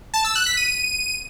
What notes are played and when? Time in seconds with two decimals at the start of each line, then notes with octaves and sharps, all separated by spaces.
0.14 A5
0.24 E6
0.35 F#6
0.46 B6
0.57 D#7